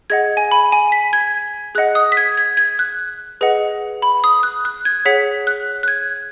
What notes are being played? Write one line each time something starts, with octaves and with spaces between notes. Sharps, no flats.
G#4 D#5 F#5 G#6
G#5
B5
G#5
B6
G#6
G#4 D#5 F#5 F#6
D#6
B6
G#6
G#6
G#6
F#6
G#4 B4 D#5 F#5
B5
D#6
F#6
F#6
G#6
G#4 C#5 F#5 B6
F#6
F#6
G#6